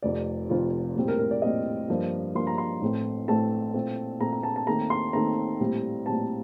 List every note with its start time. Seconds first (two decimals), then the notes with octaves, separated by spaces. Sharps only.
0.02 F1 F2 C3 D5
0.49 F1 F2 C3 F4
0.96 A#1 A2 G3 C4
1.08 A#4
1.19 A#4
1.31 D5
1.42 A#1 A2 G3 C4 D#5
1.89 G2 F3 A#3
2.35 G2 F3 A#3 C6
2.47 A#5
2.58 C6
2.81 A1 A2 A3 C4
3.28 A1 A2 A3 C4 A5
3.74 A#1 A#2 A3 C4
4.20 A#1 A#2 A3 C4 A#5
4.32 A#5
4.43 A5
4.56 A5
4.67 D#2 D#3 A3 C4 A#5
4.90 C6
5.13 D#2 D#3 A3 C4 A#5
5.60 A#1 A2 G3 C4
6.06 A#1 A2 G3 C4 A5